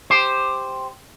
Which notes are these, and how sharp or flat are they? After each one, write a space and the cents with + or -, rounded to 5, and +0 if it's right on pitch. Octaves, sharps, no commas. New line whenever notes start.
G4 +5 C5 +0